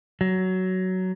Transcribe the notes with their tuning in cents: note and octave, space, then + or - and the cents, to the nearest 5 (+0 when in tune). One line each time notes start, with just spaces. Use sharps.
F#3 +10